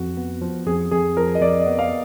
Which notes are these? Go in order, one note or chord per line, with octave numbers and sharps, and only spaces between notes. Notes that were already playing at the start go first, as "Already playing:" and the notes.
Already playing: F2 F#4
B3
F3
F2 G#4
F2 G#4
F3 A#4
D#5
F2 D5
D#5
B3
F5